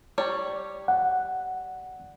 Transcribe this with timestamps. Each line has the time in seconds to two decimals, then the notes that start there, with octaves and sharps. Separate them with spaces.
0.18 G3 C#5 D5
0.88 F#5